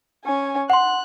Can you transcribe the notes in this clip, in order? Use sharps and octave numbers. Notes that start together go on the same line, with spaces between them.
C#4 G#5
F#5 C6 F#6